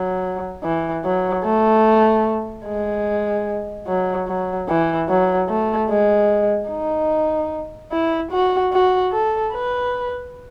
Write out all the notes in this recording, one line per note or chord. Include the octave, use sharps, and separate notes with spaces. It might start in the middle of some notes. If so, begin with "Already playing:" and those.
Already playing: F#3
E3
F#3
A3
G#3
F#3
F#3
E3
F#3
A3
G#3
D#4
E4
F#4
F#4
A4
B4